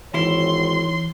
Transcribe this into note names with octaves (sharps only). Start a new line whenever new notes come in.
G#1 E3 E4 C#5 C6